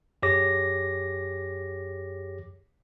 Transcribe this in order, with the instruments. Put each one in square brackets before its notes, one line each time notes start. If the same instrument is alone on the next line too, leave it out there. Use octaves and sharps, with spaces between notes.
[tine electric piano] F#2 G4 G#4 C#5 D6 A#6